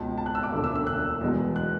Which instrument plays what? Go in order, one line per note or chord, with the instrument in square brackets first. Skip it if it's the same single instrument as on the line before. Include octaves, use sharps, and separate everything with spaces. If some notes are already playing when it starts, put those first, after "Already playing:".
Already playing: [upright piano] C#2 B2 G#3 A5
A5
F#6
E6
D6
E1 D2 D3 A3
E6
E6
F#6
E2 B2 G#3
F#6